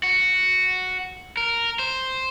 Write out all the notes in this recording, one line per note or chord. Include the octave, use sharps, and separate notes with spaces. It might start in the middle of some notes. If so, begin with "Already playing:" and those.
F#4
A#4
C5